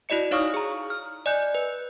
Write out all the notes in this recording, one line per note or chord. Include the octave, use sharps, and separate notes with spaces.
E4 F#4 D5 D#5 C#7
D#4 C#5 F5 C#6 D#6 F6
G#4 A#5
F6
D5 D#5 G#5 F#6 G6
B4